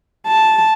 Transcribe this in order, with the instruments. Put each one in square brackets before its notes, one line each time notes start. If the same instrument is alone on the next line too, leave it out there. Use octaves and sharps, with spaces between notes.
[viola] A5